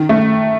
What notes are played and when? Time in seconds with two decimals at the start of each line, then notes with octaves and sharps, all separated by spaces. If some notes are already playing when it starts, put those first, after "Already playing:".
Already playing: D#3
0.09 A3